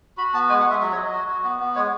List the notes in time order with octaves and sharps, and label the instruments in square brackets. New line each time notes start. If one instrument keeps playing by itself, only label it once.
[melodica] F#4 B5
B3 A5
G#3 G#5
F#5
G#3
E5
F#3 E5
C#5
F#3 D#5
F#4
F#4
B3
B3
G#3 C#5